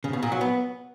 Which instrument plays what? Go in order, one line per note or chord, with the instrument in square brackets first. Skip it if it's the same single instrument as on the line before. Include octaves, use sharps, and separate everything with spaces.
[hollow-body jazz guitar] C#3
B2
A#2
F#3
B3